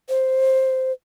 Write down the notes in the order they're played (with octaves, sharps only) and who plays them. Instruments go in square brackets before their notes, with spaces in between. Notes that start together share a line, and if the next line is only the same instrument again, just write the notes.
[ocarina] C5